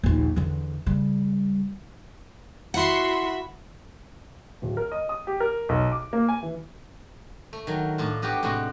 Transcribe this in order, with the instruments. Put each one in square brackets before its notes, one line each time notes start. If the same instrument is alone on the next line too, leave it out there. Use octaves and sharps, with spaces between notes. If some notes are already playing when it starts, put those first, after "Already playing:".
[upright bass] A#1 D#2
E2 D3
C#3 G3
[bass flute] E4 [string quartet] F#4 E5 B5 [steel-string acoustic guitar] F#5 [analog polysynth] C6 C#7
[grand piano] D1
A#4
D#5
D#6
G4
A#4
B1
D6
A#3
G#5
E3
[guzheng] A3
D#3 F#3
A2 D4 F4
B3 F#4 G4 F5 G5
A2 C3 G#3 F#4